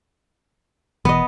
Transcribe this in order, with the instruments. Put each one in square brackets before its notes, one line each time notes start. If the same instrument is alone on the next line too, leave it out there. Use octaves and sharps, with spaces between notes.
[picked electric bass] E1 E2 [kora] B3 D#5